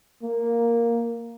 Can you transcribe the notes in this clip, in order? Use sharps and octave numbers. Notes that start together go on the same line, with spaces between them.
A#3